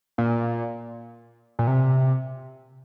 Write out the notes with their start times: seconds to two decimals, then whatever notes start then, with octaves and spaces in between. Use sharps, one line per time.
0.18 A#2
1.59 A#2
1.67 C3